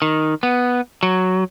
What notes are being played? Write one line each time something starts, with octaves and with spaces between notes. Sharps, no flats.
D#3
B3
F#3